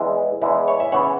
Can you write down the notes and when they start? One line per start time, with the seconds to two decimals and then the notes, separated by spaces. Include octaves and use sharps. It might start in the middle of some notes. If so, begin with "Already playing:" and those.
Already playing: E2 E3 G#3 E4
0.41 E2 E3 G#3 E4
0.68 C#5
0.80 E5
0.92 C#3 E3 B3 C#5 F#5